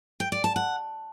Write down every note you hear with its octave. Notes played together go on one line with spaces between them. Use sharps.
G5
D5
A5
F#5